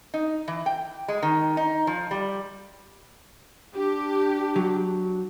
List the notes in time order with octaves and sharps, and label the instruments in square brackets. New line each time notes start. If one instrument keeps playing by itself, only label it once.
[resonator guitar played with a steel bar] D#4
E3
G5
G#3
D#3
D#4
F3
G3
[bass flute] D4 [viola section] G4
[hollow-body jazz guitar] F#3